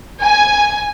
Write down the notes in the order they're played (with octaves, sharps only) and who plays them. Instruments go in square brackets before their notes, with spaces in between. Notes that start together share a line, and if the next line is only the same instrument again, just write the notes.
[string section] G#5